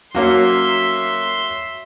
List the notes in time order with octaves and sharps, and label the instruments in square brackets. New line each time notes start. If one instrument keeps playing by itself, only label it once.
[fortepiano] F#3 A#3 C#4 [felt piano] F#4 [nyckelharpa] E5 C6